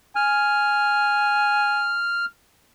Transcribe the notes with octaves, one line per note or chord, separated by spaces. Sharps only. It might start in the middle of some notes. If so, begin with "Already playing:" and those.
G#5 F6